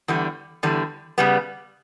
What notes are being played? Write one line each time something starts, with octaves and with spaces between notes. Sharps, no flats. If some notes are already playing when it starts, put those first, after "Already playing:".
E2 D3 G3
E2 D3 G3
C#3 G3 B3